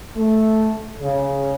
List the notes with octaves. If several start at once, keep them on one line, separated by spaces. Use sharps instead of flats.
A3
C#3